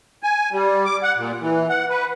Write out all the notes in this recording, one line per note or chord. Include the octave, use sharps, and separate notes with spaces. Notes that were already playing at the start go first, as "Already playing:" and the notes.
G#5
G3
D6
F#5
A#2
E3
F#5
B4